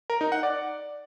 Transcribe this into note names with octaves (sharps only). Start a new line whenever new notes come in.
A#4
D#4
F#5
D5